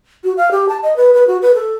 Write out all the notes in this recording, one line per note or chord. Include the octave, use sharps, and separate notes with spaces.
F#4
F5
G4
A5
D#5
B4
B4
F#4
B4
A4